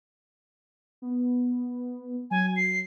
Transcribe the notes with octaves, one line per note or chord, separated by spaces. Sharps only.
B3
F#3 G#5
C7